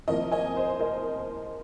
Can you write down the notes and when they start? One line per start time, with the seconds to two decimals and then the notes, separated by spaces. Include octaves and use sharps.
0.07 C3 F3 A#3 A#4 D#5
0.31 D#5 G#5
0.56 C5
0.80 A#4 D#5